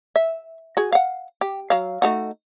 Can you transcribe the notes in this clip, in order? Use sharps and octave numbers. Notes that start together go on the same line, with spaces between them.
E5
F#4 G#4
F5 F#5
G4
F#3 F5
A3 D#4 F#4